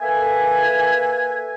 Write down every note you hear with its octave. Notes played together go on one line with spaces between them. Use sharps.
A#3 A4 B4 E5 G#5